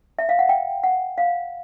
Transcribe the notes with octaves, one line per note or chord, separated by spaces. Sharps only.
E5
F5
F#5
G5
F#5
F5